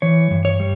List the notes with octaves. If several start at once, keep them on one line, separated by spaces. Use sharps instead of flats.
E3 C#5
G2
C#5
G3